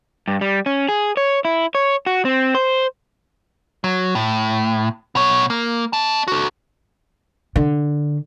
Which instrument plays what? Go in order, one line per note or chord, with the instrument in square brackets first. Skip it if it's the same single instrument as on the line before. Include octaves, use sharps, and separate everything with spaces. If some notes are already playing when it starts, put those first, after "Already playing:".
[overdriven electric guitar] G2
G3
C#4
G#4
C#5
E4
C#5
F#4
C4
C5
[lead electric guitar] F#3
A2
B2 C#5
A#3
D#5 A5
F#4 A4
[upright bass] D3